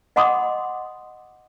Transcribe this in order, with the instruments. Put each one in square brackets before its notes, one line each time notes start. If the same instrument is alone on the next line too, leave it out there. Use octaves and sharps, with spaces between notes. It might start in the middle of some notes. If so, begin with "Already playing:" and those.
[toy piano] D#5 F#5 B5 C6 D6 D#6